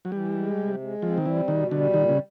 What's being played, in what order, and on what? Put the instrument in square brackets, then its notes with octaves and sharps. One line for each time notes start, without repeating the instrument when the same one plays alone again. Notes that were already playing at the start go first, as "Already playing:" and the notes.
[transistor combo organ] F#3
[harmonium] E3 [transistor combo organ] G3
[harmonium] G#3
C3
G#3
[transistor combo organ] F3 [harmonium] C4
[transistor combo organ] D#3
[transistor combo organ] E3 [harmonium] G3
[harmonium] B2 [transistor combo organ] D#3
[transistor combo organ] D3 [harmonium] G3
[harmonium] A#2 [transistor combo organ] D#3
[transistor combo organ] C#3